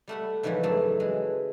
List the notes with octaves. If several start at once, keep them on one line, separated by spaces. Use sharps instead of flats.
G3 A3 F#5 B5
G#2 C#3 E3 F3 G3
F#2 A3
E3 G#3